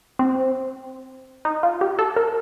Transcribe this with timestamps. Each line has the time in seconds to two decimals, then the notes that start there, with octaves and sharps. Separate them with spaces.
0.19 C4
1.45 D#4
1.63 F4
1.81 G4
1.99 A4
2.16 A#4